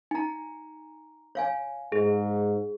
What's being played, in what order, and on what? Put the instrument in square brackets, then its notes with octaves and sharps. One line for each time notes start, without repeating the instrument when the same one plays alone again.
[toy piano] D#4 [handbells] G#5 A#5
[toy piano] C#5 F5 G#5
[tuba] G#2 [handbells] G#4